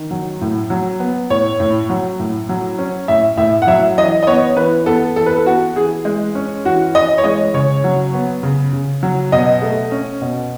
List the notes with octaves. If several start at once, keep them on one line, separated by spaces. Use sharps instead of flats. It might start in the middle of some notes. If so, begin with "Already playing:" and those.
Already playing: D#3
F#3
A2
F#3
B3
A2 C#5
A2
F#3
A2
F#3
C#4
A2 E5
A2 E5
F#5
F#3 E5
E3 D#5
D#5
B3 C#5
E3 B4
B3 A4
E3 A4
B4
A4
B3 F#4
E3 G#4
G#3
C#4
E3 F#4
E3 D#5
C#5
G#3 D#5
C#3 C#5
F#3
B3
C#3
C#3
F#3
B2 D#5
A3
C#4
B2